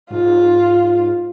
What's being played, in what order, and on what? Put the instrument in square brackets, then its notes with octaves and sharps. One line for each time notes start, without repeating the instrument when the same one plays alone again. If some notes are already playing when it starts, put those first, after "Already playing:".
[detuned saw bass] G#2 [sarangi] F4